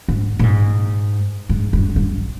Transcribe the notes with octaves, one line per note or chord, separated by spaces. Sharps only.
G#2
A#2
G#2
G#2
G2
G2